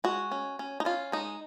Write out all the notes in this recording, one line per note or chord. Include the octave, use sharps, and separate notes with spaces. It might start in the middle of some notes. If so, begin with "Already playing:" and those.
G#3 F#4
C#4
C#4
D#4
C#4 F4
G#3 D#4